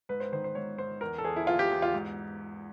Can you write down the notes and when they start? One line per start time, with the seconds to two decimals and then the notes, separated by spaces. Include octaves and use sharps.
0.09 G#2 B4
0.20 C5
0.32 D#3 C5
0.44 C5
0.55 G#2 C#5
0.78 G#2 C5
1.01 E2 A#4
1.18 A4
1.24 E2 G#4
1.36 E4
1.47 E2 F4
1.59 G4
1.71 E2
1.82 F4
1.94 G#2